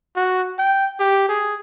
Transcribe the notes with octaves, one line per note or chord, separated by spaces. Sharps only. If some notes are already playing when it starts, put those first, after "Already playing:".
F#4
G5
G4
G#4